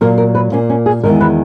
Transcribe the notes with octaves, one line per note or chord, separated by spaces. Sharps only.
A#2 F#3 A#3 A#4
A#4
B4
A#2 A#3 C#4
C#4
G#4
E2 D#3 G#3 A#4
B4